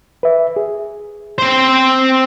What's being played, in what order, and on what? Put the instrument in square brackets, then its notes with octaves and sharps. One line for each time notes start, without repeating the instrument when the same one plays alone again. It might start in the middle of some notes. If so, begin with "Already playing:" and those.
[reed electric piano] B4 E5
G#4
[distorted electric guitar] C4 C5